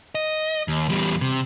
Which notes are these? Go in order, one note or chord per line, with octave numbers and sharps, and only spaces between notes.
D#5
D#2
E2 G3
C3